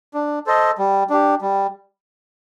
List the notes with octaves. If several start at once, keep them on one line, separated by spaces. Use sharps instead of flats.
D4
A4 C5 D#5
G3
D4 G4
G3